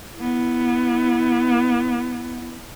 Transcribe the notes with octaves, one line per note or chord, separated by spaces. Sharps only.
B3 E4